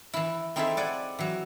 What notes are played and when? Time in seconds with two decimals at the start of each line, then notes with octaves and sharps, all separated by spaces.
0.13 E3 E4
0.56 C4 D#4 E4 G#4 A4 E5
0.77 D5 F#5 G#5
1.19 E3 F#3